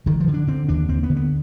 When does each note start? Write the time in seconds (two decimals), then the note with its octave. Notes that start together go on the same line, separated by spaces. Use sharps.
0.06 D3 D#3
0.20 F3
0.27 D3
0.34 D4
0.47 D3 C4
0.68 D#2 D4
0.89 D#2 C4
1.03 B3
1.10 D3
1.16 B3